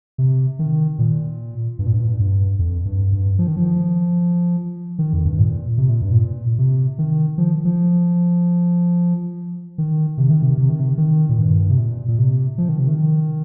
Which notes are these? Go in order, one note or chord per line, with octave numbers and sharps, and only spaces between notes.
C3
D#3
A#2
G2
A#2
G2
A#2
G2
G2
F2
G2
G2
F3
D#3
F3
D#3
F2
G2
A#2
C3
A#2
G2
A#2
C3
D#3
F3
F3
D#3
C3
D#3
C3
C3
D#3
C3
D#3
A#2
G2
C3
A#2
A#2
C3
F3
D#3
C3
D#3